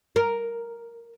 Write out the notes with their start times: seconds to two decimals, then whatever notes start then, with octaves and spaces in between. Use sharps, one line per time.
0.16 A#4